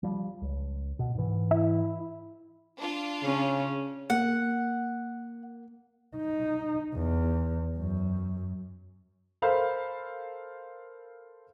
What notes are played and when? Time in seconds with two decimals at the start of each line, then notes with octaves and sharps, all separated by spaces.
0.03 F3 G3
0.42 C#2
0.99 B2
1.15 G#2 E3
1.51 E4
2.79 D4 F4
3.23 C#3 C#4
4.10 A#3 F#5
6.17 D#4
6.95 E2
7.78 F#2
9.42 A4 A#4 C5 F5 B5